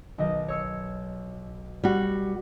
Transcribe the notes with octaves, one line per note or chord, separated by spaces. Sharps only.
B1 D#3 D#5
C#5 E6 C#7
G3 F#4